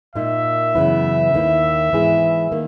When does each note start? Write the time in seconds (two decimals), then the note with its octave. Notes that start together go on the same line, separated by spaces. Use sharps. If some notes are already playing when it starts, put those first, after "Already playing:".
0.15 A#2 A#3 D#4 E5
0.75 F#2 C#3 E3 B3 E4
1.34 D#2 D#3 A#3 E4
1.93 G#2 E3 B3 E4 G#4
2.52 D#3 A#3